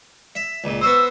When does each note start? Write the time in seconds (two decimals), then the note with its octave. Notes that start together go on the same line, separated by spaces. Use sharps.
0.35 E5
0.64 C#2 A#2
0.81 B3 F#4 C5 E6